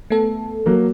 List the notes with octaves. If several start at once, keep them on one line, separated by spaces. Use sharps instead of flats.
A3 B3 A4
F#3 A#3